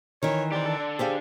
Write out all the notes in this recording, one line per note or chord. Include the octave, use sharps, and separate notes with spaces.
D#3 E3 C#5
G4 C5 D5
D4 A4
G4 G#4 C5 F5